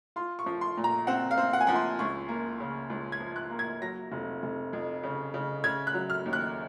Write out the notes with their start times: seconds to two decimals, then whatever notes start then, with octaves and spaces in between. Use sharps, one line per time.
0.16 F4 C6
0.39 C#6
0.46 F3
0.61 C6
0.77 A#2
0.84 A#5
1.07 C4 F#5
1.31 F5
1.38 C4
1.53 F#5
1.60 G#5
1.67 F3 F#5
1.76 C6
1.99 C#2 C#6
2.29 A#3
2.60 C#3
2.90 C#2
3.12 G#6
3.20 F3
3.36 F#6
3.51 A#3
3.59 G#6
3.82 F#3 A#6
4.12 F1
4.43 F1
4.73 F2
5.03 C#3
5.34 C#3
5.64 C#3 G#6
5.87 F#6
5.94 F#3
6.10 F6
6.26 D#2
6.33 F#6